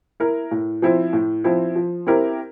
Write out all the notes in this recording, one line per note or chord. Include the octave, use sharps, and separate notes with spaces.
E4 A#4
A2
F3 C4 E4
A2
F3 C4 E4
F3
C4 E4 G4 A#4